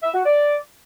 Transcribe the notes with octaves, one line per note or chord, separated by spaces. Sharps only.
E5
F#4
D5